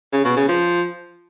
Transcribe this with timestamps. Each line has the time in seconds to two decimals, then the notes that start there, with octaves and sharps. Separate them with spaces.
0.13 C#3
0.25 B2
0.37 C#3
0.49 F3